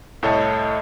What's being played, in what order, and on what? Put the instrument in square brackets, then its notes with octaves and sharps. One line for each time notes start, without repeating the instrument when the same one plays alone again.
[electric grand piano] C2 A2 A4 C#5 D#5 A5